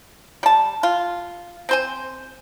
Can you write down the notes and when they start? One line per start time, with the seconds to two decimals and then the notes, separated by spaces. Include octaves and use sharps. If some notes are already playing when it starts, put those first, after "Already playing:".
0.43 G3 A5
0.83 F4
1.69 C4 C5 G#5